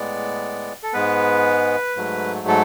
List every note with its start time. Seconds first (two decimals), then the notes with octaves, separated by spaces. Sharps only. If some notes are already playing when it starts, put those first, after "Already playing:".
Already playing: A2 G#3 B3 D5
0.83 A4
0.93 G#2 G#3 B3 B4
1.96 G#2 F#3 A3
2.48 A4